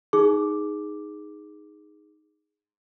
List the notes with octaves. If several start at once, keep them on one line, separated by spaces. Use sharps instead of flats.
D#4 G#4 D6